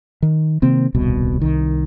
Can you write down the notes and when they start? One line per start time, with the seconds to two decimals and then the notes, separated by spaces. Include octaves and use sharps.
0.22 D#3
0.62 C3 D#3 A#3 C4
0.95 D#1 C2 B2
1.41 C2 D#3